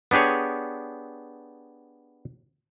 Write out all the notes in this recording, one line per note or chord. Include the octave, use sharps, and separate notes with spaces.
B3 D4 G4 G#4 C#5